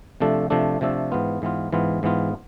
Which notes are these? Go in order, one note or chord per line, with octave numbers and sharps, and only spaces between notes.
C3 F3 A3 D4 A4
C3 F3 A3 D4 A4
C3 F3 A3 D4 A4
G#2 E3 B3 F4
G#2 E3 B3 F4
G#2 E3 B3 F4
G#2 E3 B3 F4